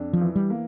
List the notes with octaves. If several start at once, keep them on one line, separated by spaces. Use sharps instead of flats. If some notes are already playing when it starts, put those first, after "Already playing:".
Already playing: F2 D4
F3
E3
G3
A#3